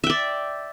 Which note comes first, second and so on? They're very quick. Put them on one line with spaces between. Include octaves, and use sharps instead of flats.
E5 G5 D5